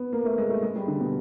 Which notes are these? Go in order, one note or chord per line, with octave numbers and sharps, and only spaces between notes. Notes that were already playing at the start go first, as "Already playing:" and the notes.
Already playing: B3
A#3
A3
G#3
A3
G#3
G3
D3
B2